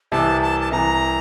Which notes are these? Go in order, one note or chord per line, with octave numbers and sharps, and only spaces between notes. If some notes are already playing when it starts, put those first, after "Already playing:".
C2 C3 E3 A5
A5
A5
C2 C3 E3 A#5